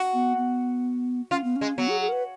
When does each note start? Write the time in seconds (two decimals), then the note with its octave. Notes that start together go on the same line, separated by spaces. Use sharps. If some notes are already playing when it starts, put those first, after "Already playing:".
Already playing: F#4
0.14 B3
0.37 B3
1.31 C#4 F4
1.44 B3
1.56 C#4
1.61 G#3
1.77 F#3 B3
1.89 G#4
2.01 G#4
2.08 A#4
2.12 B4